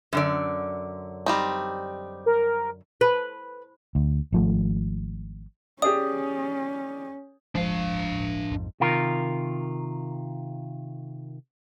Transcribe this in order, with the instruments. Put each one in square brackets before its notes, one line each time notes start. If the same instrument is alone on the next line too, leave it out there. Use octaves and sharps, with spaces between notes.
[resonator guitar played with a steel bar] F#2 D3 D5
[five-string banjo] G3 C4 D#4
[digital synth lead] A#4
[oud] B4
[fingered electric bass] D2
G#1 F3 A3
[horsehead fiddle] C#4 [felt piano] G4 G#4 D5 [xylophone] D#6
[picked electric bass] D1 G1 G#3 [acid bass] F3 [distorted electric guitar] D4 F5
[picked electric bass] A#1 F2 G#2
[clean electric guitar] C3 D#3 F4 A#4